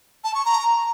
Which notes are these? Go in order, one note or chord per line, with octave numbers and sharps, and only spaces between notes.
A5
C#6
A#5